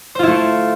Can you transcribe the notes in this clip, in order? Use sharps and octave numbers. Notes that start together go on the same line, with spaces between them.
A3 E4 F4 A4 C5